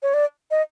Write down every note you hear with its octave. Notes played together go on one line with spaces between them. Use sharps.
C#5
D5
D#5